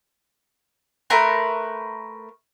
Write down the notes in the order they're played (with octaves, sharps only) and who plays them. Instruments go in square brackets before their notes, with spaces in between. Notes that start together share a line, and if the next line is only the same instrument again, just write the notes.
[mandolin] A3 A#4 B4 C6